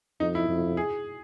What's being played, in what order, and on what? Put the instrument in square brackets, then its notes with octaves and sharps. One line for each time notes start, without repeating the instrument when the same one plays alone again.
[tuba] F2 [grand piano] D#4
[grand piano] E4
[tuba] F2
[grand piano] G#4